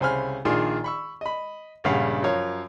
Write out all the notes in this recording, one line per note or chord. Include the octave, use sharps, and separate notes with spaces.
C2 C#3 C5 G#5 B5 F6
A#1 D#3 D4 F4 G#4 C6
B5 C#6 E6
D#5 B5
A#1 G2 C#3 F5 F#5
F#2 F3 A#4 C#5 F5